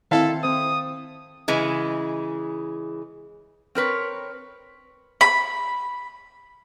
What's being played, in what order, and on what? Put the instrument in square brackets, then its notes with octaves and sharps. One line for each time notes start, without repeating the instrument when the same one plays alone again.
[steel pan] D#3 C4 [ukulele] E4 F5 A5 [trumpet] A4
[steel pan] C4 C5 [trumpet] D#6
[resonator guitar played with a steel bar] C#3 E3 G#3
C4 A#4 B4 C#5
[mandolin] B5